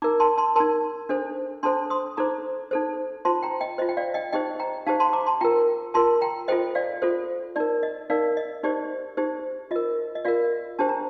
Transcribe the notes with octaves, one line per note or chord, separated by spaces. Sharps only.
D#4 A#4 A#5 D6
A5 C6
A5 C6
D#4 A#4 A5 C6
D4 A4 C5
D4 A4 C5 A5 C6
C6 D#6
D#4 A4 C5 A#5 D6
D#4 A4 C5
F4 C5 A5 C6
G5 A#5
D#5 G5
F4 C5 D#5
G5
D5 F5
D#5 G5
D#4 G4 C5 D#5 G5
G5 A#5
D#4 G4 C5 F5 A5
A5 C6
A#5 D6
A5 C6
F4 A#4 G5 A#5
F4 A#4 A5 C6
G5 A#5
F4 A4 C5 D#5 G5
D5 F5
F4 A4 C5
D#4 A#4 D5
D#5
D#4 A#4 D5 F5
D#5
D#4 G4 C5 D5
D#4 G4 C5
F4 A#4 D#5
D#5
F4 A#4 D5 F5
D4 G4 C5 A5
A#5